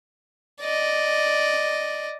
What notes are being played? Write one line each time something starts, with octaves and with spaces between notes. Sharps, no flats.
D5 D#5